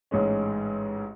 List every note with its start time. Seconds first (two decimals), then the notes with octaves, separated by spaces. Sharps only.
0.11 A1 G#2 G#3 C#4